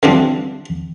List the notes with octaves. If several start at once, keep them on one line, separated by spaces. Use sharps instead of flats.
D3 E3 F3 G3 C4 D4